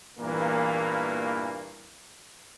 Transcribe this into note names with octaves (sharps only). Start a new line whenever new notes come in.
E2 G2 A#2 E3 A#3